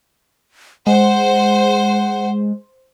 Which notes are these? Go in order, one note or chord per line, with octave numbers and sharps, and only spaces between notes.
G#3 C5 F#5